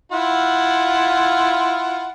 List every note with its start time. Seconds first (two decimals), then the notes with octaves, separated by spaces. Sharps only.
0.12 E4 F4 F#5